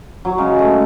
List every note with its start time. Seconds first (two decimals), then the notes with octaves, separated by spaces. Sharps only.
0.25 F#3
0.38 C#3 G#3
0.59 A3